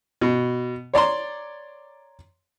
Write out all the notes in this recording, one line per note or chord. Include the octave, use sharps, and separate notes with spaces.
B2
C#5 D5 A#5 C6